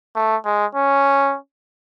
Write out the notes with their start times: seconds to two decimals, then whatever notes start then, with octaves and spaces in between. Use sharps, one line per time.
0.16 A3
0.45 G#3
0.75 C#4